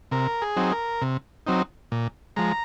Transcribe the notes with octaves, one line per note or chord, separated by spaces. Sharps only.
C3 A#4
G#4
F#3 C4 D#4
A#4
C3
F#3 C4 D#4
A#2
F3 G#3 A#5